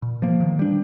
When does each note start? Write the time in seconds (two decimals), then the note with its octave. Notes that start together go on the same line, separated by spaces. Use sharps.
0.02 A#2
0.22 F3 A#3
0.40 D#3
0.59 G3 D4